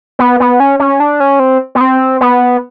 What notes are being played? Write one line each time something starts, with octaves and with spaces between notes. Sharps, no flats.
B3
B3
C#4
C#4
D4
C#4
C4
B3
C4
B3